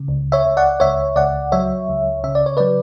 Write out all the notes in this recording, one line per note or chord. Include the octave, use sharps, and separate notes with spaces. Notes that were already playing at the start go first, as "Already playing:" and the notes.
Already playing: C#3
C#2
C#5 E5
C#2
D5 F#5
C#2 C#5 E5
C#2 D5 F#5
F#3 C#5 E5
C#2
C#3 E5
D5
C#5
F#3 B4 D5